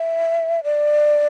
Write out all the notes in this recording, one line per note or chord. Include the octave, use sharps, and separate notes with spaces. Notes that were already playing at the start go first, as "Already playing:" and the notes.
Already playing: E5
D5